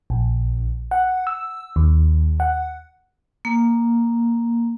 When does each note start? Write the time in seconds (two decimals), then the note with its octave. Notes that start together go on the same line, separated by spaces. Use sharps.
0.10 A#1
0.91 F#5
1.27 E6
1.76 D#2
2.40 F#5
3.45 A#3